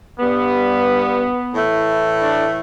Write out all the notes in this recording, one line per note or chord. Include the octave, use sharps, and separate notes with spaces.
G2 G3 B3
A2 E3 A3
D4